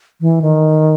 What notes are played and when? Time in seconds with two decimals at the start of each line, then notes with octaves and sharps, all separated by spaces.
0.21 E3
0.42 D#3